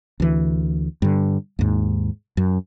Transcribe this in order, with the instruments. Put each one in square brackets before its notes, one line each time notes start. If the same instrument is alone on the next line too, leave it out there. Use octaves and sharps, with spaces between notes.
[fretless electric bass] D2 E3
G2 D3
D#2 G#2
F#2